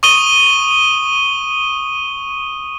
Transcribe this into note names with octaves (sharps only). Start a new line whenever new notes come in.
C#6 D#6 D#7 G7